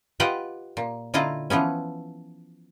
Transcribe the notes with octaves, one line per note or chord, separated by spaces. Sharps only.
F4 G4 B4 D#5 F#5 G5
A#2
D3 E4 F4 D#5 A#5
E3 F3 B3 C#4